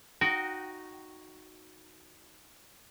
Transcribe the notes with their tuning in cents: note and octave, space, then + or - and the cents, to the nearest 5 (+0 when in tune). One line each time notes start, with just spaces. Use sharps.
D#4 +0 F#4 +0 G5 -25